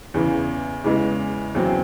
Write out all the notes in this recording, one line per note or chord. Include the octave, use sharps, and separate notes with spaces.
E2 C#3 E3
E2 C#3 E3 G#3
E2 C#3 F#3 C4